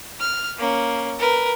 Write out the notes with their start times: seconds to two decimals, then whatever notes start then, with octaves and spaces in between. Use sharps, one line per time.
0.20 F6
0.58 A#3 C#4
1.19 A#4 B4